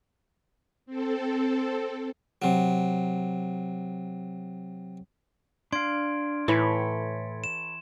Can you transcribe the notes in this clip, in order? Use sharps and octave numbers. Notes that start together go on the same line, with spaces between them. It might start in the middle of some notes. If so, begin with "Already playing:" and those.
C4 A4
C3 F#3
D4 F5 C6 G#6 D7
A2 E3 A4 C#5 B5
E7